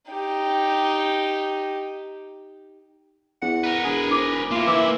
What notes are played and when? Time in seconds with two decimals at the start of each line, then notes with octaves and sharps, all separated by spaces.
0.11 D#4 G4
3.42 E2 F#5
3.64 A#4 B4
3.85 E1 G#4
4.10 D#4 C5 D6
4.51 A#3 E4 F4
4.67 E3 D#4 E5 D6